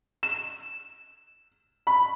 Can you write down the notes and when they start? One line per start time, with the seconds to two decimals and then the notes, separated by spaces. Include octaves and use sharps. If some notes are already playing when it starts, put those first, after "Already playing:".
0.23 E7
1.87 B5